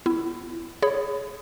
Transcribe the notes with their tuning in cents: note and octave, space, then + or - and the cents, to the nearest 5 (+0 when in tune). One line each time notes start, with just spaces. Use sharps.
B3 +25 E4 +15
G#4 +0 C#5 +0 B5 +20